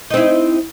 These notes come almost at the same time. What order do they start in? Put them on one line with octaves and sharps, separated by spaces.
D#4 C4 E4